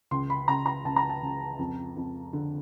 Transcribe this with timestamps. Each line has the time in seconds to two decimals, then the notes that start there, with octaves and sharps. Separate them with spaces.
0.11 C#2 C6
0.30 B5
0.48 C#2 A#5
0.66 A#5
0.85 C#2 A5
0.96 A#5
1.09 A5
1.22 C#2
1.59 F2
1.96 F2
2.33 D3